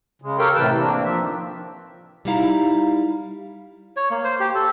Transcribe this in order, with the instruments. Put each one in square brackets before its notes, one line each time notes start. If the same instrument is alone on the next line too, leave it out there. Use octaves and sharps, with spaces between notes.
[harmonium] C#3 G#3
G4 A4 A#4 C#5 F5 G5
A2 C3 E3 B4 G5 A5
A#3 C4 D4
F3 E5
D#3
[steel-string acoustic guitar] G3 D#4 E4 F5 A#5
[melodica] C#5
A#3
C5
G4
A4